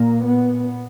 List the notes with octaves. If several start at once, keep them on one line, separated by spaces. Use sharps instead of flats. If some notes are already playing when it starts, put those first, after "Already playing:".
Already playing: A#2 A#3
B3